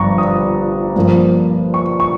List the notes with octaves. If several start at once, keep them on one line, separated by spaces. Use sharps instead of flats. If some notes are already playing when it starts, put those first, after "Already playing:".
Already playing: G1 G2 F3 A#5 C#6
D#6
G2 F3 A#3
C#6
C#6